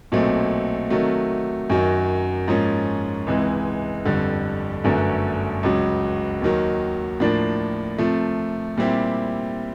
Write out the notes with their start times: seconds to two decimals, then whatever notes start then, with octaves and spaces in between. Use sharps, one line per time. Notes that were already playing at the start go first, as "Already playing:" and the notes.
0.12 B1 A#2 F#3 A3 C4
0.90 C3 D#3 F#3 A3
1.70 F#2 D#3 F#3
2.48 G#2 F3 A#3 C#4
3.27 C#2 C3 E3 G#3
4.05 G1 F2 D3 G3
4.84 G1 F#2 D3 F#3 A3
5.63 C#2 C#3 F#3
6.42 D#2 D#3 F#3
7.20 A2 F3 A#3 D4
7.98 C3 F3 A3
8.77 A#2 G3 C4 E4 G4